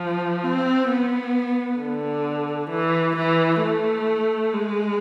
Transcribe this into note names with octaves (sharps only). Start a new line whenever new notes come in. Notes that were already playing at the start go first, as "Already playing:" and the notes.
Already playing: F3
C4
B3
D3
E3
E3
A3
G#3